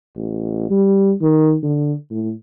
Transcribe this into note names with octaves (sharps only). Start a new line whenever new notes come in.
A1
G3
D#3
D3
A2